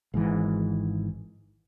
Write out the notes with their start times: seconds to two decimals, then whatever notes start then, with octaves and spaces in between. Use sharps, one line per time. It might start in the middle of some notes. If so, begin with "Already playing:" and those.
0.14 G#1 G#2 E3